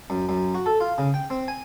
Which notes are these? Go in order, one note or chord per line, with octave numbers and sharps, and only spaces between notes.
F#2
F#2
F#4
A4
F4
C#3
G5
C4
G#5